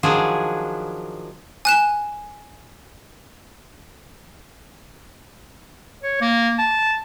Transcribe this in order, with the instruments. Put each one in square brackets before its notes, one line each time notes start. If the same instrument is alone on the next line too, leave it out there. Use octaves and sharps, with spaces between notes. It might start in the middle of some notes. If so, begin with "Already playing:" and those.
[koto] D#3 F3 F#3 D4 G#4
[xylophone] G#5 F#6 E7
[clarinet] C#5
A#3
A5